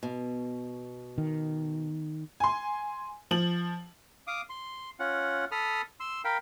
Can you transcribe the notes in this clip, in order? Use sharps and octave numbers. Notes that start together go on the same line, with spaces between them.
B2
D#3
G#5 C6
F3 F#7
F5 D6 D#6
C6
C#4 F4 F#5
A4 B5 D#6 F6
C6 E6
A#4 F5 G5 B5